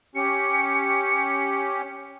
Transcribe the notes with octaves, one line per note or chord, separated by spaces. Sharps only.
C#4 G4 C#7